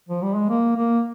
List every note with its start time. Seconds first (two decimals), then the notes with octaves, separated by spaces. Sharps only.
0.09 F3
0.22 G3
0.36 G#3
0.50 A#3
0.76 A#3